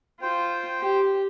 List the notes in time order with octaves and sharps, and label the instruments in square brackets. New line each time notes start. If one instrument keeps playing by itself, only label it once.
[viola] F4 [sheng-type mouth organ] C5 G5
[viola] G4